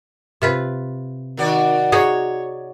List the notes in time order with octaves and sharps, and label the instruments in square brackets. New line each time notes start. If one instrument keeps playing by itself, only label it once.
[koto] C3 F4 B4
[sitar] D#3 F#4 D5
[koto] D#4 F#4 G#4 [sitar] C#5